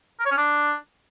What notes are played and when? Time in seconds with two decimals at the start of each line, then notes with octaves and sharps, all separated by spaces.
0.20 A#4
0.26 C#5
0.31 C#4
0.37 D4